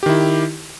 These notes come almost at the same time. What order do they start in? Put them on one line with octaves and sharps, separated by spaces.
G4 D#3 E4